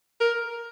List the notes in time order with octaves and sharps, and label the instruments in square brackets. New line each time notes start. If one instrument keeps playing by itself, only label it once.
[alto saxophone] A#4